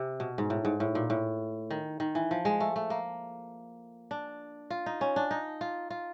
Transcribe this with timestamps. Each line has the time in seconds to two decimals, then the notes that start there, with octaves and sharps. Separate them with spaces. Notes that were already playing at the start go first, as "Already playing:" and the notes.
Already playing: C3
0.20 B2
0.38 G#2
0.50 A2
0.65 G#2
0.80 A2
0.95 A#2
1.10 A2
1.71 D#3
2.00 D#3
2.15 E3
2.31 F3
2.45 G#3
2.60 A3
2.76 A3
2.90 A#3
4.11 D4
4.70 F4
4.86 D#4
5.01 C#4
5.16 D4
5.31 D#4
5.61 F4
5.90 F4